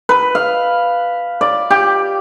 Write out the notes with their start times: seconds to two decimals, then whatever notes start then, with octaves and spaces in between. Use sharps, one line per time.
0.09 B4
0.35 F5
1.41 D5
1.70 G4